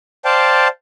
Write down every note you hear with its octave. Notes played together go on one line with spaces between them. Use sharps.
C5 D5 F5 G5 A5